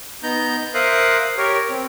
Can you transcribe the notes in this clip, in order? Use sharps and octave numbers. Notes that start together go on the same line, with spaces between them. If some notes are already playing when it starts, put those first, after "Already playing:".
B3 D#4 A#5 G6
A#4 C5 E5 F5 D#6 F#6
G4 A#4 C#5
C4